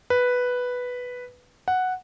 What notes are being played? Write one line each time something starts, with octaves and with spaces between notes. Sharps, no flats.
B4
F#5